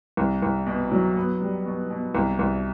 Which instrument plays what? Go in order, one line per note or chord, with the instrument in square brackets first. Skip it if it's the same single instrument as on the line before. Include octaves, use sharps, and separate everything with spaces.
[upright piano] C2
C2
B2
F#3
B3
G3
B2
B2
C2
C2